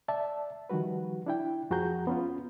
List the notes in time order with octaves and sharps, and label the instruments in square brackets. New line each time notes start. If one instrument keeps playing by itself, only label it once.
[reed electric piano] D5 E5 A5
D#3 F3 G3 F#4 B4
D4 E4 G5
F2 F3 F#4 G#4 A#5 G6
B3 C#4 F4